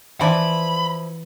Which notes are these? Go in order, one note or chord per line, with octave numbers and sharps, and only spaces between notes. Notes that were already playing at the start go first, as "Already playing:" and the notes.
E3 F3 E4 D5 B5